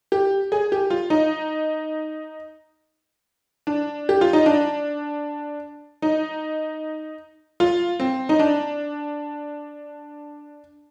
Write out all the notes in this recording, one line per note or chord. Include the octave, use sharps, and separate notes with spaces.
G4
G#4
G4
F4
D#4
D4
G4
F4
D#4
D4
D#4
F4
C4
D#4
D4